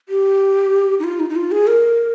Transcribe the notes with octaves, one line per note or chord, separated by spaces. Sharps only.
G4
D#4
F4
D#4
D#4
F4
G#4
A#4